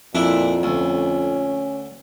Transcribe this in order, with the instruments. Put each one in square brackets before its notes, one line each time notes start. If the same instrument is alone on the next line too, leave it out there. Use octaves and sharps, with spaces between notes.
[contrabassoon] F2 [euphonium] A#2 [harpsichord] D4 E4
[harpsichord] D2 [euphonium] C#4